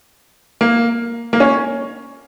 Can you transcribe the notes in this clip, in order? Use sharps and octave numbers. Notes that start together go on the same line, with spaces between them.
A#3
A#3
C#4